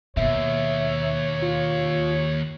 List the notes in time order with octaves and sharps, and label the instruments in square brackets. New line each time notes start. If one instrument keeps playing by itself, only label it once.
[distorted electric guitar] D#2 [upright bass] B2 [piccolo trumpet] C#5 [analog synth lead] E5
[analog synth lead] F4